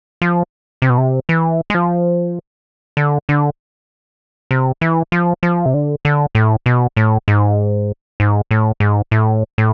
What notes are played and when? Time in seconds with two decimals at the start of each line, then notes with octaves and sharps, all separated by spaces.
0.22 F3
0.82 C3
0.90 B2
0.98 C3
1.29 E3
1.70 G#3
1.75 F3
2.97 D3
3.29 D3
4.51 C3
4.81 E3
5.12 F3
5.43 F3
5.66 C3
5.74 D3
6.05 D3
6.35 A2
6.66 B2
6.97 A2
7.28 G#2
8.20 G#2
8.51 A2
8.80 G#2
9.11 A2
9.58 A2